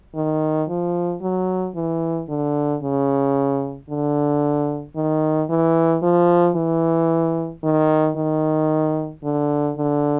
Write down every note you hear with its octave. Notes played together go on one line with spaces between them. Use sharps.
D#3
F3
F#3
E3
D3
C#3
D3
D#3
E3
F3
E3
D#3
D#3
D3
D3